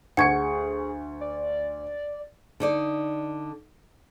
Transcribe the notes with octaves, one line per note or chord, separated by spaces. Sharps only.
D2 G#4 F#5 C#6 G#6 C#7
D5
D3 D#4 D5